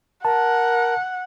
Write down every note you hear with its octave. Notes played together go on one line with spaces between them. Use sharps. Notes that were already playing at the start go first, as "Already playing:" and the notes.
A#4 F#5 A5